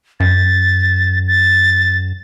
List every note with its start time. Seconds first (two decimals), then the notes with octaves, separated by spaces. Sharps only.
0.20 F#2 A6
1.27 A6